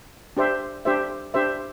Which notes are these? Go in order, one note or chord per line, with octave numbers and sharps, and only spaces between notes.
D4 G4 C5 E5
D4 G4 C5 E5
D4 G4 C5 E5